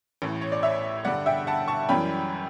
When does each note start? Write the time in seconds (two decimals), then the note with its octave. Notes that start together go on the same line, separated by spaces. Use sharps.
0.22 A1 A2 E3
0.41 C#5
0.52 D5
0.63 C#5 E5
1.05 G2 D3 G3 D5 F#5
1.26 E5 G5
1.47 F#5 A5
1.68 A5 C#6
1.89 F#2 E3 G3 C#4 G5 B5